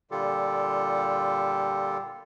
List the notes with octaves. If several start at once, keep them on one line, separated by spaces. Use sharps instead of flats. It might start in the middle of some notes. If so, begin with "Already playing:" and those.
A#2 D3 G3 F4 G4 A4